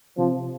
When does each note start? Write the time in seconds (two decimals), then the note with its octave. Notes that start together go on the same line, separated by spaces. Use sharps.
0.17 C3 F3